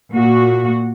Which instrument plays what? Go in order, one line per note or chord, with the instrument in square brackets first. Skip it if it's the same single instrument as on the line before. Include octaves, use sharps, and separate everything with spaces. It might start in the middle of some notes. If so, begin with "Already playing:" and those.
[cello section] A#2 F#4